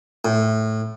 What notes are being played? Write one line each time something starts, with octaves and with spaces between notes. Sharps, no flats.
A2